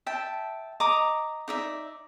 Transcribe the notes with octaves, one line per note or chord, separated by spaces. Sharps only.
E5 G5 A5
D#5 A#5 D6 D#6
D#4 D5 E5